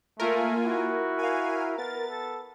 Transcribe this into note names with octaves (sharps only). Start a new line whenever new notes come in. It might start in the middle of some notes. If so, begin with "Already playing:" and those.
A3 A#3 F4 A#4 G#5
E4 F#4
F5 G#5
B3 A6
A4